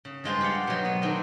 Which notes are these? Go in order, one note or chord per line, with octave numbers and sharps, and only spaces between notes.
C#3
G2 G#3 F4 C5
G4 D5 F5 F#5
B2 F#3
B3
D#3 C4 D4 A#4